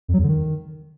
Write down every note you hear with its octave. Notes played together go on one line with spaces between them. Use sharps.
F2
F#3
E2
D3
D#3